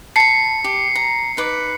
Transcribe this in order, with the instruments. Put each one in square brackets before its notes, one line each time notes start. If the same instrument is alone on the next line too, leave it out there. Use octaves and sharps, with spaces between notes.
[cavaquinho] A5 B5 [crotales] C7 C#7
[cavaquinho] G4
A#5
D#4 B4 D6